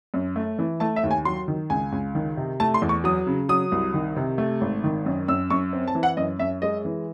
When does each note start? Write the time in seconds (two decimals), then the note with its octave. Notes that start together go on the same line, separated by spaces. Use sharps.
0.14 F#2
0.36 A3
0.59 E3
0.80 A3 A5
0.96 E5
1.04 D#2
1.11 G#5
1.25 F#3 C6
1.48 D#3
1.70 C#2 G#5
1.92 C#2
2.15 D#3
2.37 C3
2.60 A3 A5
2.74 C6
2.82 E2
2.89 C#6
3.04 F#3 D#6
3.27 C#3
3.49 F#3 D#6
3.72 C2
3.94 D#3
4.16 C3
4.38 A3
4.61 G#1
4.84 D#3
5.06 F#2
5.28 F#2 E6
5.50 F#2 C#6
5.73 C4
5.88 A5
5.95 E3
6.03 F#5
6.17 F#2 D#5
6.39 F#2 E5
6.62 G#3 D#5
6.85 E3